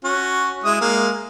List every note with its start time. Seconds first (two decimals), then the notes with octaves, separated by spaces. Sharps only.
0.04 C#4 F#4
0.64 G#3 E4 D#6
0.81 G#3 A#3